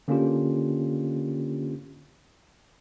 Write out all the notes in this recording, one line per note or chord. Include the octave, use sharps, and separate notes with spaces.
D3 A#3 C#4 D4 F4 G4